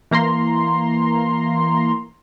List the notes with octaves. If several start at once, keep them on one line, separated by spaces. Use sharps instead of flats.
E3 A#3 A#5 C6